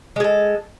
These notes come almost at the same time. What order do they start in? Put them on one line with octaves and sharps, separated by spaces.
G#3 G#4 A4